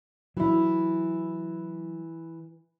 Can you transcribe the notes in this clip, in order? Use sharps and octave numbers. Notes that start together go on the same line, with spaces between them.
E3 F#3 E4